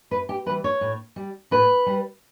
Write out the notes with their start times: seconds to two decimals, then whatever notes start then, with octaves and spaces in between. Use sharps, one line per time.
0.11 F#2 B4
0.29 G4
0.46 G3 B4
0.49 E3
0.64 C#5
0.81 A2
1.16 G3
1.51 A2 B4
1.86 G3